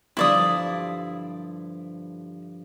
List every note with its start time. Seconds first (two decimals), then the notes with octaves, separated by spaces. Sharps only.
0.17 G2 D3 F3 E4 D5 D#6